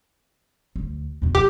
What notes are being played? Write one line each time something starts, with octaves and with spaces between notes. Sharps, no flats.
D2
E2 B2
F3 G4